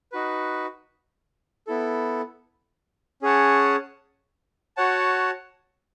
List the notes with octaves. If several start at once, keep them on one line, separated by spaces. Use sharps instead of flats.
D#4 F#4 B4
B3 E4 A4
C#4 G#4 C#5 F#5 A5
F#4 C#5 F#5 A5